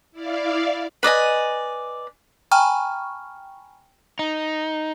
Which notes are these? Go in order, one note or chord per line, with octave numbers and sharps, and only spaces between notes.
E4 D5 F5
B4 D5 D#5 G#5
G5 G#5 A#5 B5 C#6 F6
D#4